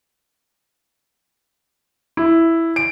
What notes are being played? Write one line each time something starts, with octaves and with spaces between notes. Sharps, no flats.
E4
D7